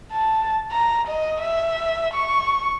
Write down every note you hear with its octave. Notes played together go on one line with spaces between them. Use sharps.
A5
A#5
D#5
E5
C#6